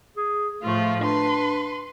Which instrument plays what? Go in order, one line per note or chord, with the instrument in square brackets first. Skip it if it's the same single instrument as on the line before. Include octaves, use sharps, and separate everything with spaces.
[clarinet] G#4
[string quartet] A2 F3 F4 [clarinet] A3
[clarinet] D4 [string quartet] B4 C6